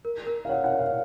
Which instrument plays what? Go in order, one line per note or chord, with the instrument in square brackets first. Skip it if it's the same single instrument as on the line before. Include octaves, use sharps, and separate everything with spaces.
[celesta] A#4
A#4
[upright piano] F5
[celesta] C#5 [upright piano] F#5
[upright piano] F#5
[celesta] C#5
[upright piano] F5